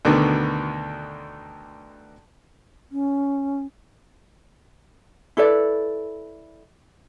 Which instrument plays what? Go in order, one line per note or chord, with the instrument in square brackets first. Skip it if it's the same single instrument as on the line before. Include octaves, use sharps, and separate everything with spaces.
[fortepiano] D2 B2 D3 D#3 B3
[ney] C#4
[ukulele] E4 A4 B4 D5